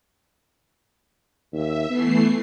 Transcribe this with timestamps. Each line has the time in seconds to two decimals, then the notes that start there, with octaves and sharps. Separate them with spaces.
1.52 D#2 E5
1.90 E3 A3 B3 C7